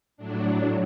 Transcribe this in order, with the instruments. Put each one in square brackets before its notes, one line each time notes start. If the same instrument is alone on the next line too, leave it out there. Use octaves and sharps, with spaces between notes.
[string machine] A2 F#3 D4